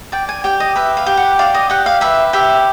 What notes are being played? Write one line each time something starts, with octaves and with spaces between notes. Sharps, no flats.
D5 G5
G#5
G4 G5
D#5
B4 E5
F5
G4
F#5
D5 F5
D#5
G4 F#5
F5
B4 E5
G4 E5